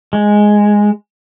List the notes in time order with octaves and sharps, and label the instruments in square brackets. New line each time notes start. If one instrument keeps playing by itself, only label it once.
[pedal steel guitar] G#3